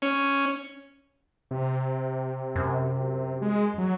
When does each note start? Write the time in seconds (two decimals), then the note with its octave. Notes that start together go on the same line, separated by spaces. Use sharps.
0.02 C#4
1.51 C3
2.56 F#2
3.42 G#3
3.78 F#3